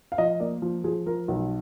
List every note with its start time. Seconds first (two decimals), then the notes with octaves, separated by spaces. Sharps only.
0.12 F5
0.18 F3 D#5
0.40 A#3 D5
0.62 F3
0.84 F3 G#4
1.06 F3 A#4
1.28 B1